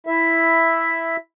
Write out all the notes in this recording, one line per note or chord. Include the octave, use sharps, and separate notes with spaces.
E4 E5